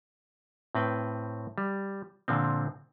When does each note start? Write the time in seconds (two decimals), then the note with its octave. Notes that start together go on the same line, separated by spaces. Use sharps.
0.75 A2 C4 B4 G5
1.58 G3
2.28 A#2 D3 F3 C4